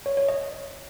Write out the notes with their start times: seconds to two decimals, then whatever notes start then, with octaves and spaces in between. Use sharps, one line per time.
0.06 C#5
0.17 C#5
0.29 D#5